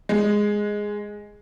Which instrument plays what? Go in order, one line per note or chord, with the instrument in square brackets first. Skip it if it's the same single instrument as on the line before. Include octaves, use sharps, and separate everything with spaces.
[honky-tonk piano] G#3